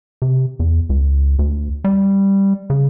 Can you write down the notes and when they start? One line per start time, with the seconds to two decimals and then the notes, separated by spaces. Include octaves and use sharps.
0.22 C3
0.60 E2
0.89 C#2
1.39 D2
1.84 G3
2.70 C#3